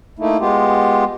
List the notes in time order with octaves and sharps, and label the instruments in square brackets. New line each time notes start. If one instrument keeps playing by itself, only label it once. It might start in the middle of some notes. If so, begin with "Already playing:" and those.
[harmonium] A3 A#3 D#4 E4
G#3 B3 F4 G4